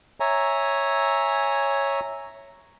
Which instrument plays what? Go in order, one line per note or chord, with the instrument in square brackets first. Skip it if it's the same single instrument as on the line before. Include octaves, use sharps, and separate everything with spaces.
[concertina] C#5 E5 G#5 A#5